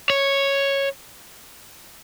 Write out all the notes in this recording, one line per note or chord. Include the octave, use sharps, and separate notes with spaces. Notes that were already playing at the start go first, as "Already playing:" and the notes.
C#5